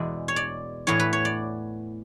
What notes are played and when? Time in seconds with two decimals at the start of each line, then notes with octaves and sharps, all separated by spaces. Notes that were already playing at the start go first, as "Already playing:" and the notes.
Already playing: E2 B2 G#3 D5 E5
0.28 C#5
0.36 D5
0.87 A2 E3 B3 C#5
1.00 B4
1.13 C#5
1.25 D5